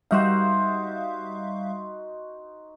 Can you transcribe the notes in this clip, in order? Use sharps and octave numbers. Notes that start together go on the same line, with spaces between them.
G3 D#4 F#4 C5 E5 F5